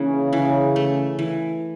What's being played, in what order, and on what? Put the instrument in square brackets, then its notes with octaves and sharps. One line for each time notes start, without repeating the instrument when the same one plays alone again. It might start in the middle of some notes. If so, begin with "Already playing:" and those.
Already playing: [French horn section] C#3 [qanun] E3 A#3
[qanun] E3
A3
E3